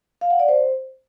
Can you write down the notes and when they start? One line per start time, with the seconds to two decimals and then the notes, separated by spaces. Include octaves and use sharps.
0.21 F5
0.30 F#5
0.39 D5
0.49 C5